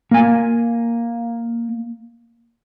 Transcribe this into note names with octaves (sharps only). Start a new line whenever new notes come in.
A#3 G#5